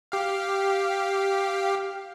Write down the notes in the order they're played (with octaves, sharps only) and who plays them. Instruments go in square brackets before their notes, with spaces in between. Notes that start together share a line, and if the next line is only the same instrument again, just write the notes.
[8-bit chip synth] G4 F5